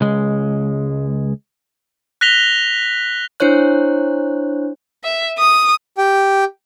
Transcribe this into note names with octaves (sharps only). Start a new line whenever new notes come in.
C#2 G#3
F#6 A#6 B6 F7 G7
D4 E4 C5 C#5 F#6
E5
D#6
G4 G5